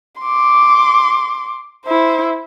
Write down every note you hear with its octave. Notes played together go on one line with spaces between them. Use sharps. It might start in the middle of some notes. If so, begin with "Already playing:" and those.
C6 D6
E4 C5